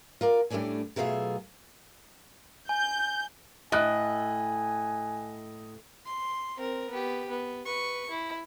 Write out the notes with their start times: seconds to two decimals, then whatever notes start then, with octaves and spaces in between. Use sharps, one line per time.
0.21 F4 A#4 D5
0.50 A2 G3 A3 C#4 D4 G#5
0.96 B2 F#3 A3 F4 G#4 E5
2.69 G#5 G6
3.72 A2 D#5 G#5 F#6
6.06 C6
6.57 C4 A#4
6.90 B3 G4
7.29 B3
7.65 B4 C#6
8.10 E4